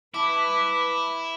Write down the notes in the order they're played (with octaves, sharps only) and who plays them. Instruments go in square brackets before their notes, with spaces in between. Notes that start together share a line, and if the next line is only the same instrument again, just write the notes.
[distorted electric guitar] E4 [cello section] B4 [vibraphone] A5 D6